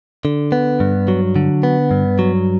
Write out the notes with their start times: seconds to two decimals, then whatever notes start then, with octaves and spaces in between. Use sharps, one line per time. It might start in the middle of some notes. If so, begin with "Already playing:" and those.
0.25 D3
0.52 B3
0.80 G2
1.08 F#3
1.36 D3
1.63 B3
1.91 G2
2.19 F#3